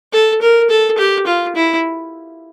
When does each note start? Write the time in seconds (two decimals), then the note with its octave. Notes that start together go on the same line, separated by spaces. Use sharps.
0.13 A4
0.42 A#4
0.70 A4
0.98 G4
1.27 F4
1.56 E4